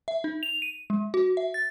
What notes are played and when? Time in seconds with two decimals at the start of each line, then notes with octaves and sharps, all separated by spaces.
0.08 E5
0.24 D#4
0.43 F7
0.62 D#7
0.90 G#3
1.14 F#4
1.37 E5
1.54 A6